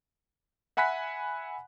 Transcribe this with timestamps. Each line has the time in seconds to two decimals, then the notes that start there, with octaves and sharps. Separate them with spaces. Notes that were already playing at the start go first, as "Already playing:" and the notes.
0.77 E5 F#5 G#5 B5 F#6 B6